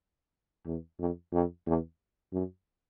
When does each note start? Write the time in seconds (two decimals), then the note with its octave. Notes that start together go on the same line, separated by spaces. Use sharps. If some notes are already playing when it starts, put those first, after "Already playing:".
0.66 E2
0.99 F2
1.33 F2
1.67 E2
2.33 F#2